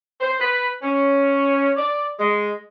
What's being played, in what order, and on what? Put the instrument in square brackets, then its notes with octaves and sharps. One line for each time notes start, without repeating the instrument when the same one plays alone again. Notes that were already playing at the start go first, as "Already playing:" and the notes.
[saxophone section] C5
B4
C#4
D5
G#3